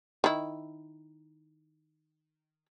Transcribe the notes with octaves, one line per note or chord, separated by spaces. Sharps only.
D#3 E4